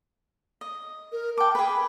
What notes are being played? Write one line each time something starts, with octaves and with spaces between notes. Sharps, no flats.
D#5
A#4
G5 A5 D6
G#4 B4 G5